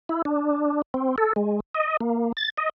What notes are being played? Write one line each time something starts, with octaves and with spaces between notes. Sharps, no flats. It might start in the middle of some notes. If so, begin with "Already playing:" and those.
E4
D4
C4
A4
G#3
D#5
A#3
A6
D#5